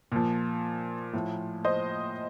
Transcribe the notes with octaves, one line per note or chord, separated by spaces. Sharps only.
A#2 F3
A2 F3
C5 D#5